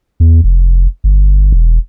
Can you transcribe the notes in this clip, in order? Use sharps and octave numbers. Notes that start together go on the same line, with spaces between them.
E2
F1
G1
E1